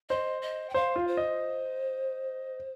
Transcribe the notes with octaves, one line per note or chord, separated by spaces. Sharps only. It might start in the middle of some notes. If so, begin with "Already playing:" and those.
C5 D#5
D#5
G5
C5 F5
F4
C5
D#5